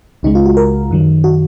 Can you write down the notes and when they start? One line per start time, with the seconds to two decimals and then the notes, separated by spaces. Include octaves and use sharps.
0.23 C#2 C#3 G#3 D#4
0.35 F4
0.46 F#4
0.57 A#4
0.91 F#2 D#3 F#3
1.24 F#4